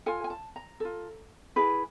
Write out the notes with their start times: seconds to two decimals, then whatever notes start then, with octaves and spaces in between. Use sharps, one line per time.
0.06 F4 A4 G#5
0.24 G#5
0.30 A5
0.56 A#5
0.80 F4 A4
1.56 E4 G#4 B4